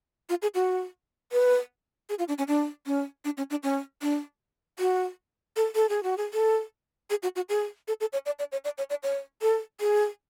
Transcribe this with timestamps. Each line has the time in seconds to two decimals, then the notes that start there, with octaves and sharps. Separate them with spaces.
0.29 F4
0.42 G#4
0.55 F#4
1.32 B4
2.09 G#4
2.19 F4
2.28 D4
2.38 C#4
2.48 D4
2.86 C#4
3.25 D4
3.38 C#4
3.50 D4
3.63 C#4
4.02 D4
4.79 F#4
5.56 A4
5.75 A4
5.89 G#4
6.03 F#4
6.18 G#4
6.33 A4
7.10 G#4
7.23 F#4
7.36 F#4
7.49 G#4
7.88 A4
8.01 A4
8.13 C#5
8.26 D5
8.39 D5
8.52 C#5
8.65 D5
8.78 C#5
8.90 D5
9.03 C#5
9.42 A4
9.81 G#4